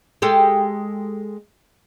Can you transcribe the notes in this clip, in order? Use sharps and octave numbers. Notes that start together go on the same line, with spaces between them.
G#3 G4 A4